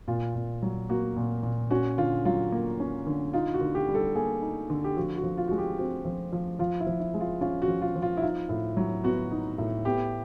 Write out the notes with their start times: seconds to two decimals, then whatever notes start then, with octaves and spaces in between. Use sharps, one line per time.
0.08 A#2 F4
0.35 A#2
0.63 F#3
0.89 A#3 F#4
1.16 A#2
1.43 A#2
1.71 C#4 F#4
1.98 D3 F4
2.25 F#3 F4
2.52 A#3
2.80 C#4
3.07 D3
3.34 D#4 F4
3.54 F#4
3.61 D3
3.75 G4
3.88 G3
3.95 A4
4.15 A#3 G#4
4.42 D#4
4.70 D3
4.84 G4
4.97 F3 F#4
5.17 F#4
5.24 F3
5.37 F4
5.48 G#3 F#4
5.58 G4
5.78 C4 F#4
6.05 F3
6.33 F3
6.59 F3 F4
6.80 E4
6.87 F3
7.00 E4
7.14 G#3
7.20 F4
7.41 C#4 F4
7.62 F#4
7.68 F3
7.82 F4
7.96 F3
8.02 F4
8.17 E4
8.22 D#4 F4
8.49 A2
8.77 F#3
9.04 B3 F#4
9.31 D#4
9.58 A2
9.85 B3 G4